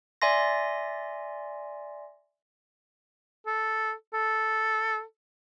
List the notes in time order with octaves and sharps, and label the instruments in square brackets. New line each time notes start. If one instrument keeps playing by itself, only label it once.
[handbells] D5 E5 G#5 C6 A#6
[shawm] A4
A4